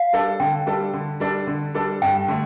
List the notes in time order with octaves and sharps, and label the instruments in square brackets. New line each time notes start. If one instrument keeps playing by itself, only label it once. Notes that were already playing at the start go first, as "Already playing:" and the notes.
Already playing: [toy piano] F5
[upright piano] G3 D4 A4
[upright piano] D3 [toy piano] G5
[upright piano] G3 D4 A4
D3
G3 D4 A4
D3
G3 D4 A4
[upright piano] G2 [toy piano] G5
[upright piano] D3 A3